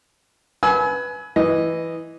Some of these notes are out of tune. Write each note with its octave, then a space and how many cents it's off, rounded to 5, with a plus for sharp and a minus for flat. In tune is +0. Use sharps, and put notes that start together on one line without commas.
B4 +0 G#5 +25 E6 -30
E3 +0 D#5 -5